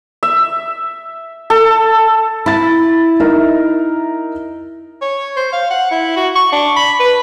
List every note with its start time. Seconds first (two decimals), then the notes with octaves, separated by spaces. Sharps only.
0.23 E5
1.50 A4
2.46 E4 B5 A6
3.20 D#4 A#4 E5
5.01 C#5
5.36 C5
5.53 F5
5.70 F#5
5.91 E4
6.16 F#4
6.35 C#6
6.52 D4
6.76 B5
7.00 B4